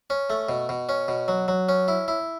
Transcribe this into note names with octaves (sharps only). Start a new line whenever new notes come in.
C#4
A3
B2
B2
C#4
B2
F#3
F#3
C#4
E4
E4